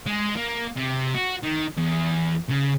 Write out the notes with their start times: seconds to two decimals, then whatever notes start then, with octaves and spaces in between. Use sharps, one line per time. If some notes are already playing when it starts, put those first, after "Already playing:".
0.06 G#3
0.36 A#3
0.76 C3
1.14 F#4
1.43 D#3
1.78 E2
2.49 C#3